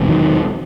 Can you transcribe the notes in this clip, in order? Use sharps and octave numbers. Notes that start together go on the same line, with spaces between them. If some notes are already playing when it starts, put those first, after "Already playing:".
Already playing: E1 E2 C3
D#3 F#3